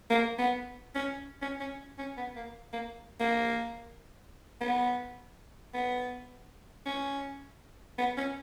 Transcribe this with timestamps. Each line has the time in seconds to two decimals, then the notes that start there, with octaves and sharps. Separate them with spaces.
0.10 A#3
0.39 B3
0.95 C#4
1.42 C#4
1.60 C#4
1.99 C#4
2.17 B3
2.36 A#3
2.73 A#3
3.20 A#3
4.61 B3
5.74 B3
6.86 C#4
7.98 B3
8.18 C#4